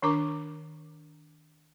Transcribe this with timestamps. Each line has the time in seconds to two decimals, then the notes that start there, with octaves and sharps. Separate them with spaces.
0.02 D#3 D4 A#4 A#5 D6